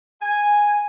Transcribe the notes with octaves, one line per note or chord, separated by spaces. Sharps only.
G#5